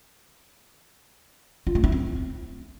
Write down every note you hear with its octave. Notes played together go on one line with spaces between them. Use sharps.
F4
A3
E4
C4